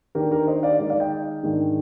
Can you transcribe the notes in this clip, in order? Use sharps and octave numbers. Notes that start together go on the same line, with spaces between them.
D#3 A#3 D4 G4 A#4
G4 A#4
C5 D#5
D5 F5
D#3 G#3 D#4 A#4 D5
D5 F5
D#5 G5
G#2 D#3 G#3 D4